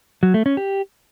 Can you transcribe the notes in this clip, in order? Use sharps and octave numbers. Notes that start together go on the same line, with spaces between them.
F#3
A3
C#4
G4